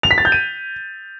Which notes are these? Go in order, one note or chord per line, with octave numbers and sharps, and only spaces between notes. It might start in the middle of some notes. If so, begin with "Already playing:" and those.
F7
B6
A6
G6
D#7